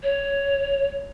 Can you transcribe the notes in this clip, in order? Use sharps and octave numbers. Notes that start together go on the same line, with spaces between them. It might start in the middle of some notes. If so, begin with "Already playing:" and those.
C#5